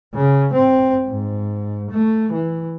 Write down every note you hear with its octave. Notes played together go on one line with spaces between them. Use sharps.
C#3
C4
G#2
A3
E3